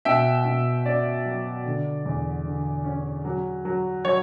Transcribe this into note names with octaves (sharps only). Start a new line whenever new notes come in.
B2 E5 G5
B2
C#4 D5
F#3
D3
E2
D3
C#4
F#3
F#3
F#3 C#5